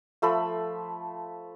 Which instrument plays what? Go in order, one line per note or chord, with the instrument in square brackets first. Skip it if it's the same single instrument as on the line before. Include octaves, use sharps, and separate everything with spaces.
[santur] F3 A3 A4 B5